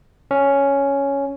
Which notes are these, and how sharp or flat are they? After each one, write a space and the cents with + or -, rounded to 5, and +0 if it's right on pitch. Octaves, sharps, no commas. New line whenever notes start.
C#4 +5